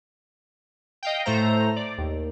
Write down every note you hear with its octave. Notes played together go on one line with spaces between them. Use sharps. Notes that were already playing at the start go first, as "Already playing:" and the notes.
D#5 F5 G5
A2 A3 C5 A#5
D5
D#2